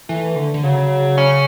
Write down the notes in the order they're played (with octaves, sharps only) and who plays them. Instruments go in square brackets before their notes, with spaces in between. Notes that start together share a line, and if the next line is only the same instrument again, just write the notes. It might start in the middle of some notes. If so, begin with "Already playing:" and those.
[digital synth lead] E3 [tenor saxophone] A3
[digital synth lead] D3
D3
[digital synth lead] C#3 [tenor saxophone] F#3
[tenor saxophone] C#4